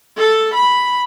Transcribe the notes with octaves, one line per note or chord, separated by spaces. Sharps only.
A4
B5